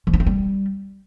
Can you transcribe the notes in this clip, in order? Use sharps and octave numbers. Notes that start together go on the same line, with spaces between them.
F3
D4
C4
G3